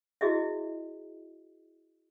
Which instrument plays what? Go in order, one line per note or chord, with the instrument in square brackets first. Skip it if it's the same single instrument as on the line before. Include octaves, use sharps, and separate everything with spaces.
[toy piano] E4 F#4 G#4 D#5 E5